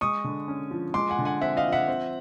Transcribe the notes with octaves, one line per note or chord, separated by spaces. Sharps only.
G#3 C#6 D#6
D3
C#4
F3
G#3 C6 D6
F#5 G#5
D3
F#5 G#5
C4 E5 F#5
D#5 F5
F3
E5 F#5
C4